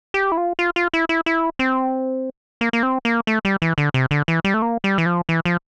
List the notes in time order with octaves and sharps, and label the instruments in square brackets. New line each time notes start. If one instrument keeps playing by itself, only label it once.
[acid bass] G4
E4
F4
F4
F4
E4
E4
E4
C4
A#3
A#3
C4
A#3
A3
G3
E3
D3
C3
D3
E3
G3
A3
A#3
G3
E3
F3
E3
F3